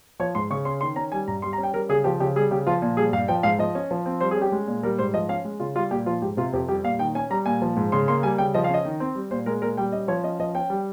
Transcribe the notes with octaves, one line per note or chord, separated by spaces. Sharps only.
F3 C#5
G#2 C6
C#3 C#6
C#4 C6
D#3 C6
C#4 A#5
G3 G#5
G2 A#5
G3 C6
A#5
C#4
G5
G3 A#4
C#3 G#4
F3 G4
C#3 G4
G3 G#4
C#3 G4
F3 F4
A#2
G3 G#4
G2 F5
F3 G5
G#2 F5
F3 D#5
C#4
F3
C4
G3 C5
G#4
C#4 G4
G#3
A#2
G3 A#4
G#2 C5
F3 D#5
C#4 F5
G#3
C#3 F4
G3 F4
A#2 G4
F3 F4
G#2 G4
C3 F4
F2 G4
G3 G4
A#2 F5
D#3 G5
C#4 G#5
G3 A#5
A#2 G#5
F3
G#2
C#3 C6
A#3 C6
G3 G#5
C#3 G5
F3 D#5
F5
C#4 D#5
D#3
C4
G3
A#2 C5
G#3 A#4
A#2 A#4
G3 G5
C#4 D#5
F3 C#5
C#4 D#5
F3 D#5
C#4 G5
G3